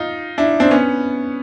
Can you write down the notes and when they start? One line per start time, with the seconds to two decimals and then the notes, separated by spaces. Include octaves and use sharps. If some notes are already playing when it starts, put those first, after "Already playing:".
Already playing: D#4 F4
0.38 D4 E4
0.60 C4 D4
0.71 B3 C#4